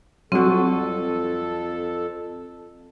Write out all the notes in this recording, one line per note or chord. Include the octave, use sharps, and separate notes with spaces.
F2 F#3 G3 C4 F#4 A4